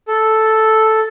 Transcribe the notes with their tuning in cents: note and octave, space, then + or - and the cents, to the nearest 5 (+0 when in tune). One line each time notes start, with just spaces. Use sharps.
A4 -5